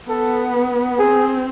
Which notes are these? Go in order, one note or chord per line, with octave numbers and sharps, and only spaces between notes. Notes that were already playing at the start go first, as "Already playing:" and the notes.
B3 A4
C4 G#4